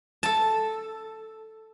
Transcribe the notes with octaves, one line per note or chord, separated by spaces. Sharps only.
A4 A5